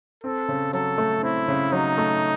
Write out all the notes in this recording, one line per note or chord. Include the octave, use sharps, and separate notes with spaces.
C4 A4
C#3
F#3 A4
A3
C4 E4
C#3
F#3 D#4
A3